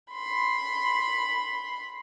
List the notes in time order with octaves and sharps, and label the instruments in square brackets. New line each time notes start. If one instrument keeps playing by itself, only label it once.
[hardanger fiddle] B5 C6